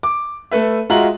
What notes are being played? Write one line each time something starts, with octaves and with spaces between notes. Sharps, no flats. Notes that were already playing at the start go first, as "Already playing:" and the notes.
D6
A3 A4 B4 E5
G#3 F4 F#4 E5 A#5 F#7